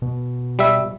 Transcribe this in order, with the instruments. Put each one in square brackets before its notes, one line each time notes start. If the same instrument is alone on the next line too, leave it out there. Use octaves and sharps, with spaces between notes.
[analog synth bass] B2
[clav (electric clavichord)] G3 E5